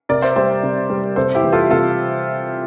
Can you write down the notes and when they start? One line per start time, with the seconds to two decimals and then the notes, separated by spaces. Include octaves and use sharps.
0.09 C3 A#4 D5
0.22 C5 E5
0.36 G3 C5 E5
0.63 C3
0.90 G3
1.16 C3 A4 C5
1.35 E4 G4
1.43 E3 G3
1.52 F4 A4
1.70 C3 F4 A4